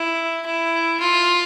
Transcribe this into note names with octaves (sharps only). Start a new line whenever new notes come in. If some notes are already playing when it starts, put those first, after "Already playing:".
Already playing: E4
E4
F4